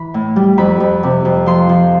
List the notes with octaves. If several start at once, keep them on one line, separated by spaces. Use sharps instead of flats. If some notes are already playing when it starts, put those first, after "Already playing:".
Already playing: E3 B5
A2
G3
F2 B5
F2
C3
F2
F3 C6
F3